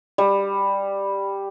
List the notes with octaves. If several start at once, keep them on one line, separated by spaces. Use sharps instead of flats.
G3